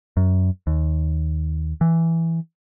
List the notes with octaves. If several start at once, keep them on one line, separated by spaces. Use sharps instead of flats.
F#2
D#2
E3